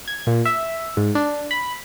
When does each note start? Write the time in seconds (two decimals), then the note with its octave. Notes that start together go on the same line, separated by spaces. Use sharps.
0.08 G#6
0.27 A#2
0.45 E5
0.97 G#2
1.15 D4
1.51 B5